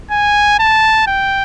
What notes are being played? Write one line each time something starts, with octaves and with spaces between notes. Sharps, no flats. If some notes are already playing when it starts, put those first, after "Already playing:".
G#5
A5
G5